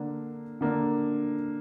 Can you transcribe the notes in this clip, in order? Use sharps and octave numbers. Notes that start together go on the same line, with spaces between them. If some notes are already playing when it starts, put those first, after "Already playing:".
Already playing: D3 A#3 D4
D3 A#3 D4